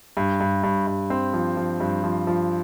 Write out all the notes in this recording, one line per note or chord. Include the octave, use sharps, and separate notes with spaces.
G2
G2
G2
G2
C4
F3
F3
G2
F3
F3